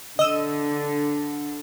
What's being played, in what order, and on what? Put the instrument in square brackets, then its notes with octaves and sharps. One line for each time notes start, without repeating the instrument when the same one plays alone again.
[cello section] D3 [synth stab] D#5 E6